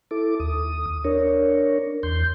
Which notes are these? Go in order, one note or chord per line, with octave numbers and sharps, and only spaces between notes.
E4 A4 D6
D#2 D#6
D4 A#4 C#5
E2 C6 G6